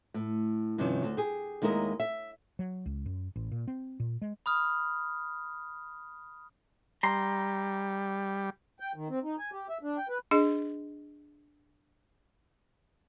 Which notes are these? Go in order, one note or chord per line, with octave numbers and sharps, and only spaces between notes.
A2
G2 C3 D#3 F3 C#4
D2
G4 G#4
D#2 G#3 D#4 E4 A#4 D#5
E5
F#3
C#2
F#2
A1
A#2
C4
A#2
G#3
B5 D#6 F6
G3 A#5 C6
G5
D#3
C4
D#4
G#5
G4
E5
D4
G5
B4
D4 G#4 D#5